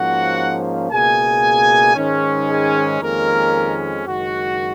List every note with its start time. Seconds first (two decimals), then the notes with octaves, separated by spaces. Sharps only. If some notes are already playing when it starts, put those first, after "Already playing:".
Already playing: G#2 F3 A#3 C#4 F#4 F#5
0.91 C#2 B2 A#3 G#4 G#5
1.96 G#2 D#3 G#3 C#4
2.49 G#4 G#5
3.01 F2 D#3 G#3 A#3 C#4 A#4
4.06 F#1 F#2 D#3 G#3 F#4